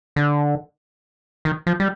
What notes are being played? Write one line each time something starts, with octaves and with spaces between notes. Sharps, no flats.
D3
D#3
F3
G3